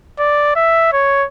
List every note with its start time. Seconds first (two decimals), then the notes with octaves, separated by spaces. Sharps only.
0.19 D5
0.56 E5
0.93 C#5